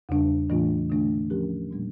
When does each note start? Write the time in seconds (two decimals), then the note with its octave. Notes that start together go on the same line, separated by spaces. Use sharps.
0.09 E2 C#3 G3 D4
0.50 A2 E3 A3 D4 F4
0.90 D3 A3 D4
1.30 F3 C#4 G4 A#4
1.71 A#2 G3 A#3 D4